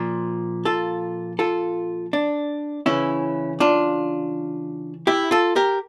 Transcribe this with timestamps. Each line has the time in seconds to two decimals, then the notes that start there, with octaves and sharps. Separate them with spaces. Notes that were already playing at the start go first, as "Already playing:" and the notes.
Already playing: A#2 F3
0.65 F4 A4
1.39 F4 A4
2.13 D4
2.86 C#3 E3 C#4 E4
3.60 D4 F4
5.07 E4 G4
5.31 F4 A4
5.56 G4 A#4